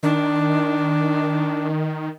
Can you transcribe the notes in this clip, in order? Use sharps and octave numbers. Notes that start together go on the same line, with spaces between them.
D#3 D4